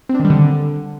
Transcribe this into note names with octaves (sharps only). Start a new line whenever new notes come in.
C4
D4
D#3
G3
D3